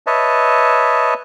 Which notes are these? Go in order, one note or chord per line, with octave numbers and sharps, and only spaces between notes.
B4 C#5 D#5 E5 A5